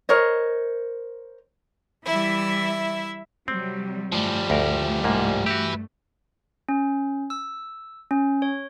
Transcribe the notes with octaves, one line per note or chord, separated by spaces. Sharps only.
A#4 C5 C#5 D#5
E3 G3 E4 E5
C3 F#3 G3 C4
G2 F3 G3 A3
D2 A#4
C2 G#2 A#3
F#4 G4 B4 E5
C#4
E6
C#4
C#5